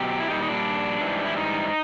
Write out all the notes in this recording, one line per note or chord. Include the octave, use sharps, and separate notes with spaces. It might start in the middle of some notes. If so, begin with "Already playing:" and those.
Already playing: B2 F#3 G4
E4
A#2 G3 D#4
D#4
D4
G#2 E3 G3
E4
D#4